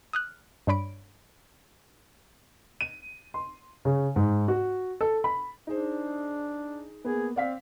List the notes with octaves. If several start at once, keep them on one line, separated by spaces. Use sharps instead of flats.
D#6 F6 F#6
G2 D4 C#5 B5 D7
D#7
C6
C#3
G#2
F#4
A4
B5
D4 D#4 G#4 C5
A#3 B3 G#4
C4 D5 F5 B6